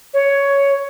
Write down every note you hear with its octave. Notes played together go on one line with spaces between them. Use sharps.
C#5